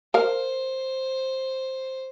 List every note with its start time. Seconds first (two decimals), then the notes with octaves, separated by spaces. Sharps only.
0.14 A#4 C5 F5